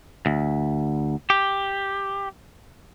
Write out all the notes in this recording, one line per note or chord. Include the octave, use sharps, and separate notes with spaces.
D2
G4